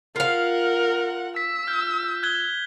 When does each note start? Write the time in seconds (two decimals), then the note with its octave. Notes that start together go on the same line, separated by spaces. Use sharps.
0.16 F4 A#4 F5 F#5
1.36 E6 B6
1.67 F6 G6
2.23 F#6 G#6 G7